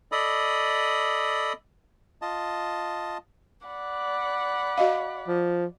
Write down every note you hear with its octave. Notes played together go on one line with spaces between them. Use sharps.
A4 D5 D#5 B5 D#6
F4 D#5 A5
D5 F#5 B5
F#4 D#5 F5
F3